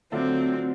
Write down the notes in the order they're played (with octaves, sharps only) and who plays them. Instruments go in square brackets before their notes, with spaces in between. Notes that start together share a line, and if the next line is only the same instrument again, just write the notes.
[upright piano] D3 F#3 A3 D4 F4 [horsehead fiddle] C4